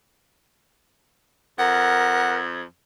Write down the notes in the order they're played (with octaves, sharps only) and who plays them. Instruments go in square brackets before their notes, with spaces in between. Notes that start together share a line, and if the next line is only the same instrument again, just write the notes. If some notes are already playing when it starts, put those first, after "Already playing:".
[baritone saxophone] F2 [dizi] A#4 [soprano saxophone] F#5